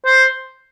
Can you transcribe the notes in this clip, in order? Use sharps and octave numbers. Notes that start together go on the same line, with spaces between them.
C5